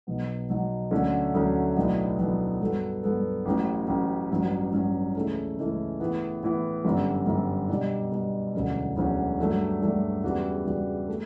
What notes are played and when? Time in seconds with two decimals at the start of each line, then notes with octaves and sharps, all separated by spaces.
0.07 B1 B2 F#3 B3
0.49 B1 B2 F#3 B3
0.91 D2 D3 F#3 A3 C#4
1.34 D2 D3 F#3 A3 C#4
1.76 B1 A2 F#3 B3 D4
2.19 B1 A2 F#3 B3 D4
2.61 G2 F#3 B3 F#4 A4
3.03 G2 F#3 B3 F#4 A4
3.45 A1 A2 F#3 C#4
3.88 A1 A2 F#3 C#4
4.31 A1 G2 F#3 C#4
4.73 A1 G2 F#3 C#4
5.15 C#2 C#3 E3 A3 C#4
5.57 C#2 C#3 E3 A3 C#4
6.00 A2 E3 B3
6.43 A2 E3 B3
6.85 G1 F#2 D3 G3
7.26 G1 F#2 D3 G3
7.69 B2 G3 D4
8.12 B2 G3 D4
8.55 E1 D2 D3 F#3 C#4
8.96 E1 D2 D3 F#3 C#4
9.38 G2 F#3 A3 D4
9.81 G2 F#3 A3 D4
10.23 E2 C#3 G3 D4 F#4
10.66 E2 C#3 G3 D4 F#4
11.08 A3